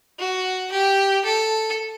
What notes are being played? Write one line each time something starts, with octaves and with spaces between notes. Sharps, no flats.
F#4
G4
A4